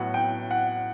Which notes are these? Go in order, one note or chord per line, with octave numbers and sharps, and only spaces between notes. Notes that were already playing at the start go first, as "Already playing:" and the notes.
Already playing: A2 F#3 B3 F#5
G5
F#5